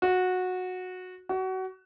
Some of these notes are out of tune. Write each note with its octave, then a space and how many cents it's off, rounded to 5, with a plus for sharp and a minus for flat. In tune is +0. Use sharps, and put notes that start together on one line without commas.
F#4 -15
F#4 +25